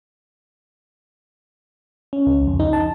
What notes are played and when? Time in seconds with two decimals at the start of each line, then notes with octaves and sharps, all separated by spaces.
2.13 C#4
2.27 C#2
2.47 F2
2.60 D#4
2.73 A5